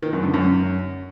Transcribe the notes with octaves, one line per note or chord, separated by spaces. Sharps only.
D#3
F#2
D3
F#2